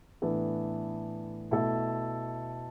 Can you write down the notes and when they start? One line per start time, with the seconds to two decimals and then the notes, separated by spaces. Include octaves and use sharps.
0.22 A2 E3 B3 D4 A4
1.51 B2 A3 E4 A4